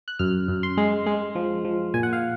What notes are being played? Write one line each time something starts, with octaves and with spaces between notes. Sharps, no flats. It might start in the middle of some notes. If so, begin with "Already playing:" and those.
F#6
F#2 F6
F#2
C6
G#3
G#3
F3
F3
A#2 G#5
F#5
F5